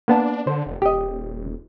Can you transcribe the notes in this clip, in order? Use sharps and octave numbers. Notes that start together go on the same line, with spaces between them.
A#3 B3 D4 A5
D3 C5
F1
D#1 G4 D#5